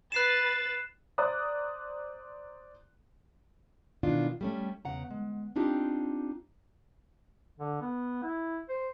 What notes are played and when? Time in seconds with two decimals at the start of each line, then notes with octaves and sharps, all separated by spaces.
0.12 B4 F#6 A6 C7 E7
1.18 C5 D5 A#5 D#6 F#6
4.03 B2 D#3 E3 D4 E4 F4
4.41 G3 A3 C#4
4.85 E2 C#3 F#5 A#5
5.11 G#3
5.56 C4 D4 D#4 F4 G4
7.59 D3
7.82 B3
8.23 E4
8.69 C5